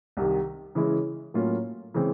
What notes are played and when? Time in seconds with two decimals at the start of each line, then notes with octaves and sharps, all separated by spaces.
0.17 C2 C3 D#3
0.75 C#3 E3 G#3 C#4 E4
1.34 A2 F#3 A#3 C#4 F4
1.94 C#3 E3 G#3 C4